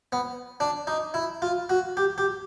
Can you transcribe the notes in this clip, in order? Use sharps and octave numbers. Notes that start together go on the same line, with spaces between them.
B3
D4
D#4
E4
F4
F#4
G4
G4